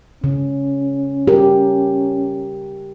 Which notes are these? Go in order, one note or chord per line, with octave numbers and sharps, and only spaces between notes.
C#3 C#4
G4 A#4